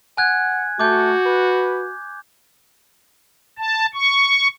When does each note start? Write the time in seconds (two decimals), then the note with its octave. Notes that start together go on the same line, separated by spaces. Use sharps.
0.17 F#5 G#5 F#6 G#6
0.79 A3 F#4 D6 G6
1.26 B4
3.58 A5
3.94 C#6